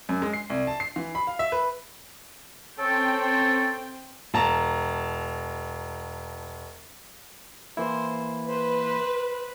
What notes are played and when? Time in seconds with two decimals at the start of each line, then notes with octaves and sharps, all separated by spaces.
0.09 F#2
0.22 G#3
0.33 C7
0.50 C2
0.67 A5
0.80 C7
0.96 E3
1.15 B5
1.27 F5
1.39 E5
1.52 B4
2.79 C4 C#4 A4 G5
4.34 E1 A5 A#5
7.77 E3 A#3 E4 C5
8.49 B4 C5